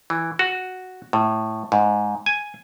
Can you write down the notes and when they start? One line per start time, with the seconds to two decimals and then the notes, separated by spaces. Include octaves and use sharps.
0.10 E3
0.39 F#4
1.13 A2
1.72 G#2
2.26 G#5